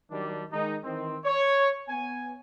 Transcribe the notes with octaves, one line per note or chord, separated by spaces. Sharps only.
D#3 F#3 G3 D4
D#3 G#3 D#4
D#3 E3 C4
C#5
B3 G#5